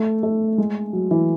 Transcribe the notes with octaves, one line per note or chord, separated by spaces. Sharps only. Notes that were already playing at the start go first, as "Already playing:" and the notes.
Already playing: A3
A3
G#3
F#3
E3